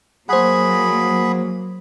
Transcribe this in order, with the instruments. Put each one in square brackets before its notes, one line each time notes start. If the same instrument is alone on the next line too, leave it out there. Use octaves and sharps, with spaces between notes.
[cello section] F#3 A#3 [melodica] G#4 B5 [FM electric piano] C5 F#5